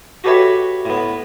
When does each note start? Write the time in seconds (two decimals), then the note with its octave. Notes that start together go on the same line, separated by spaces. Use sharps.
0.24 F#4 G4 A4 B4 C#5 E5
0.85 A2 B3